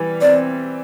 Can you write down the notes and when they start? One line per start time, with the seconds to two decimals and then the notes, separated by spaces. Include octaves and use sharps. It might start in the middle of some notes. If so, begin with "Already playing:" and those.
Already playing: E3 G3
0.21 C4 D5